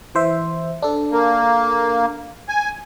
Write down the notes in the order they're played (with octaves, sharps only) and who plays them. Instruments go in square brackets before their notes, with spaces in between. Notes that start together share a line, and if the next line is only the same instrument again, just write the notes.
[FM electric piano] E3 C5 E5
D4 A4
[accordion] A#3
G#5